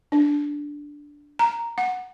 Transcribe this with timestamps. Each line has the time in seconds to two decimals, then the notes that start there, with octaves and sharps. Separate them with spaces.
0.12 D4
1.39 A#5
1.78 F#5